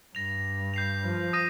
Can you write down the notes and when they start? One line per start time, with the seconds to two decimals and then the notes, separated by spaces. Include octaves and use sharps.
0.15 G2 A#6 F7
0.74 G6 C7 F7
1.04 F3
1.33 D#6 A#6 D#7